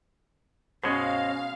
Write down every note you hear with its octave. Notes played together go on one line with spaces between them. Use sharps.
B2 G#3 C#4 C5 C#5 D#5 F5